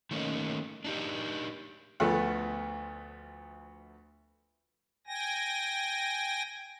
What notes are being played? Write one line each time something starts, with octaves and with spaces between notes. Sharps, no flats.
D#3 A3 A#3 C#4 D#4
D4 D#4 G4
D2 F3 A3 B3
G5 G#5 A#6